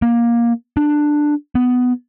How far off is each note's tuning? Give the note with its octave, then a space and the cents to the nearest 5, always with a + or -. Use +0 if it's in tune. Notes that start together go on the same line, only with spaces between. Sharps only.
A#3 +15
D4 +10
B3 +10